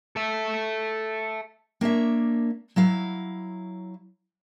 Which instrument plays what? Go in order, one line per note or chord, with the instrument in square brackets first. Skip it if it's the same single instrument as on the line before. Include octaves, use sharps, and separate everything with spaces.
[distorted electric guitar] A4 E5
[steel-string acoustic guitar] A#3 D4 C#5 E5
F#3 E4 F5